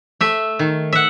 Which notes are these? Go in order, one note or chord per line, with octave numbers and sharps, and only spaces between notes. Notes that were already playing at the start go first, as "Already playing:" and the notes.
A3 E5
D#3
E5 F#5